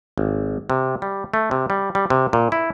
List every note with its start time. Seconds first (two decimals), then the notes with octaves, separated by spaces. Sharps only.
0.18 G#1
0.70 C3
1.02 G3
1.34 A3
1.51 C3
1.70 G3
1.95 G3
2.10 C3
2.33 A#2
2.52 E4